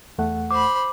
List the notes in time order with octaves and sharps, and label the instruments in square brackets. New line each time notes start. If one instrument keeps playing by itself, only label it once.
[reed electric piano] E2 A3 F#5
[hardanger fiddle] C5 B5 [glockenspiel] D6